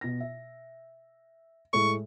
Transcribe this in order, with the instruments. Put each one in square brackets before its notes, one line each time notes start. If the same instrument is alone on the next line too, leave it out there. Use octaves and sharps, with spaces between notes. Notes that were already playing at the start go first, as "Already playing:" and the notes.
[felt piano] B2 A#6
E5
[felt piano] A2 G#3 A3 [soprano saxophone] C#6